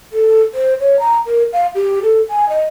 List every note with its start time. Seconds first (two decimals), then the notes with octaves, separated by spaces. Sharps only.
0.13 A4
0.54 C5
0.80 C#5
0.99 A#5
1.26 A#4
1.53 F5
1.75 G4
2.03 A4
2.29 G#5
2.49 D#5